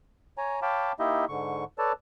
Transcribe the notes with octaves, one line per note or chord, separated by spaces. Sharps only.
C#5 G#5 A#5
C#5 F5 G5 A5 B5 D6
A#3 D#4 E4 G4 D#5 E5
G#2 D3 C#6
A4 B4 C#5 D5 A5